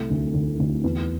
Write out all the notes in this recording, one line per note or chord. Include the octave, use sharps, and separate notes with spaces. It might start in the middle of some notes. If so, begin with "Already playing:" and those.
Already playing: C2 A3
D2
D2
D2
E2